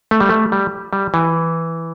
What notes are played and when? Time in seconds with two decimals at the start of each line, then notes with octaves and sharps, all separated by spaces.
0.11 A3
0.20 G3
0.29 A3
0.52 G3
0.93 G3
1.14 E3